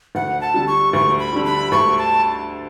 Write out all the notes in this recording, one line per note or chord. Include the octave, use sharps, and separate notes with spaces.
D2 F#5
A5
D3 G3
C#6
D2 C#6
B5
D3 G3
B5
D2 C#6
A5